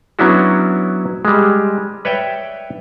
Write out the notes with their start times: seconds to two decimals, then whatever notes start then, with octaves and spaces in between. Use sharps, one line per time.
0.19 F#3 B3 C#4 D4 E4 F#4
1.25 G3 G#3
2.05 B4 C#5 D5 E5 G5